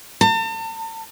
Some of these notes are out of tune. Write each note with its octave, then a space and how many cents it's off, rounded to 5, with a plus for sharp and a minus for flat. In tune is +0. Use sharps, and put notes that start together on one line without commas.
A5 +40